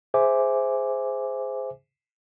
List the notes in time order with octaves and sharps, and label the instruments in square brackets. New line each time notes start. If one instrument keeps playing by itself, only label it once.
[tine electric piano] G#4 C5 E5 G#5 D6